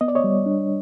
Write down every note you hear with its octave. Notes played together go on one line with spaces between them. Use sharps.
B3 D#5
D5
C#5 D#5
G3
D4